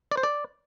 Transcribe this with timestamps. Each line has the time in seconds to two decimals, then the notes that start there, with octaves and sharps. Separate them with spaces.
0.11 D5
0.17 C5
0.23 D5